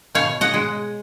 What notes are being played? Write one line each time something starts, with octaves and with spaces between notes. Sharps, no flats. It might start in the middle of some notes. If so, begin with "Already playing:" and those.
B2 C#5 F5
D#5 F#5
G#3